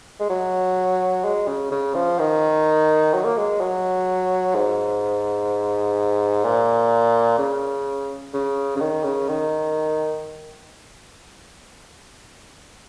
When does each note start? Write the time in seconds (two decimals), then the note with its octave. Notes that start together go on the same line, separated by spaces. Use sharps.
0.20 G#3
0.30 F#3
1.25 G#3
1.48 C#3
1.71 C#3
1.95 F3
2.19 D#3
3.14 F#3
3.25 A#3
3.37 G#3
3.60 F#3
4.55 G#2
6.45 A#2
7.39 C#3
8.34 C#3
8.76 C#3
8.80 D#3
9.04 C#3
9.29 D#3